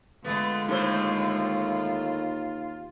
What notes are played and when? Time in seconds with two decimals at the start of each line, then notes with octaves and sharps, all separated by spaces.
0.24 D3 G#3 A3 B3 F4
0.68 D#2 A2 A3 C5